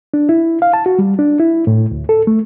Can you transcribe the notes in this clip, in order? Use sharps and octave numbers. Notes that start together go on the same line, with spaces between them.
D4
E4
F5
A5
F#4
G3
D4
E4
A2
D2
A4
A3